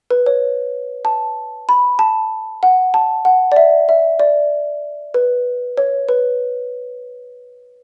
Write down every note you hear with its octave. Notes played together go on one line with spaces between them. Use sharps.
B4
C#5
A5
B5
A5
F#5
A5
F#5
D5
E5
E5
D5
B4
C#5
B4